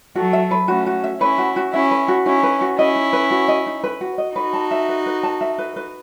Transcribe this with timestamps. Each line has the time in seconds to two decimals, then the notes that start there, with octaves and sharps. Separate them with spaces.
0.16 F#3 A3 F#4
0.33 E5
0.51 B4
0.68 A3 C#4 F#4
0.86 F#4
1.04 E5
1.21 C#4 E4 B4
1.38 F#4
1.56 F#4
1.73 C#4 E4 E5
1.91 B4
2.08 F#4
2.26 C#4 D#4 E4
2.43 B4
2.61 F#4
2.78 C#4 E4 D#5
2.96 D#4
3.13 B4
3.31 F#4
3.48 D#5
3.66 D#4
3.84 B4
4.01 F#4
4.18 D#5
4.36 D#4 F#4 B4
4.53 A5
4.71 E5
4.88 B4
5.06 B4
5.23 A5
5.41 E5
5.58 B4
5.76 B4